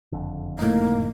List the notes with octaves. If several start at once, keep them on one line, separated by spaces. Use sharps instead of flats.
F#1 F2 D3
A2 A#3 D#4